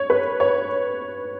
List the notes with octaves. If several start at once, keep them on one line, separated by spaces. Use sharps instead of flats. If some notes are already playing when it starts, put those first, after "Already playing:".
Already playing: C#5
B4
C#5